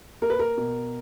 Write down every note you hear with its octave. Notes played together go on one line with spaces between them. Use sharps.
A#3 A#4
B4
A#4
B2